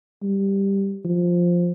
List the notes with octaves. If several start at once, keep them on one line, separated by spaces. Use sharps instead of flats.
G3
F3